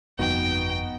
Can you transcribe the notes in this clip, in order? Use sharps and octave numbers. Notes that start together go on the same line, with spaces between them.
G1 F2 B3 D#4 F#4 G5